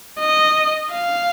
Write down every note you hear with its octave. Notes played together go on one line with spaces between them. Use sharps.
D#5
F5